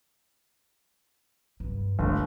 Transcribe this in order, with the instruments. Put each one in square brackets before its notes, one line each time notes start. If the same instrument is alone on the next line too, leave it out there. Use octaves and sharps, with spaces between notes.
[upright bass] G2
[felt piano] G1 [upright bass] D2 A3